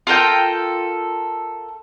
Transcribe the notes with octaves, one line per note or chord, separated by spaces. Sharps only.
F4 A4 A#4 G5